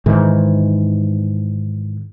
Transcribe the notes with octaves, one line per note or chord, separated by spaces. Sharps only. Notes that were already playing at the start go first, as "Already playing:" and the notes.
G#2 D#3 E3